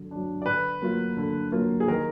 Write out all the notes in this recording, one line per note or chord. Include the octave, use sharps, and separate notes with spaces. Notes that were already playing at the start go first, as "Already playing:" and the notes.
Already playing: D3 F#3
F#3 D4
D5
D3 B4
F#3 A#3 F4
D3
F#3 A#3 F4
G#4
D#3 A#4